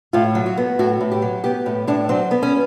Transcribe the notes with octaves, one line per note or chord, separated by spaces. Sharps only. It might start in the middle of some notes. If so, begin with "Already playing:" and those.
A2 F4
F#3
F#4
B3
A2 F#4
A2
G4
F#3
B3 G4
A2
A2 D4
F#3 C4
B3
C#4